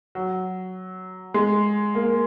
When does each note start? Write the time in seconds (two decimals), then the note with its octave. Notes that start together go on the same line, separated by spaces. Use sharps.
0.15 F#3
1.34 G#3
1.95 A#3